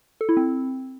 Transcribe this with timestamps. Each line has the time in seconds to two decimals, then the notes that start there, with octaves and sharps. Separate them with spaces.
0.21 A4
0.29 E4
0.37 C4